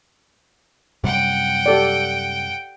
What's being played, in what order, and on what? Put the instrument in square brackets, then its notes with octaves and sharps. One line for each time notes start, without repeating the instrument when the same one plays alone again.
[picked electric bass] F#2 C3 G3 [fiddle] F#5 G5
[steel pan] G4 A4 D5